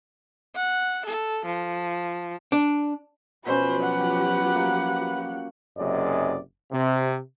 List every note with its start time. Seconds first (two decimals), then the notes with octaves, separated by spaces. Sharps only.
0.56 F#5
1.06 A4
1.45 F3
2.52 D4
3.47 B2 F3 F#3 C#4 G4 B4 C5
3.83 F#5
4.55 A#3
5.78 F#1 F#2 C3 G#4 D5 D#5
6.73 C3